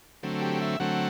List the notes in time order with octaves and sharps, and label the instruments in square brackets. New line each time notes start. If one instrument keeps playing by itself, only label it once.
[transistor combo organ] D3 F#3 A3 C4
G4
E5
D3 F#3 A3 C4 F#5